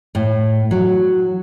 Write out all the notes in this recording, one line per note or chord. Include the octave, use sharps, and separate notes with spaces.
A2
F#3